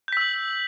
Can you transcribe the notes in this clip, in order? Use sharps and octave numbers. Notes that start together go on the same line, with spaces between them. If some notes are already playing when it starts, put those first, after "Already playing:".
E6 G6 B6 F#7